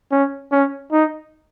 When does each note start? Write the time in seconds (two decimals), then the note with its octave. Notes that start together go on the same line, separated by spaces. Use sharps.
0.12 C#4
0.52 C#4
0.92 D#4